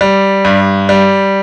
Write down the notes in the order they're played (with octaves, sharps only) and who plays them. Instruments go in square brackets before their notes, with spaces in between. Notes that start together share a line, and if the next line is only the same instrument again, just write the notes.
[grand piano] G3
G2
G3